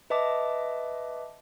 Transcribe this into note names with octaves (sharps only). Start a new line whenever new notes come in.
B4 D#5 E5 A5 D6